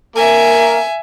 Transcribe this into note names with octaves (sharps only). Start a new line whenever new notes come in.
A#3 A#4 E5 G#5